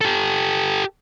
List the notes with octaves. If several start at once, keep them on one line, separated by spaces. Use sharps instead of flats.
G4 A4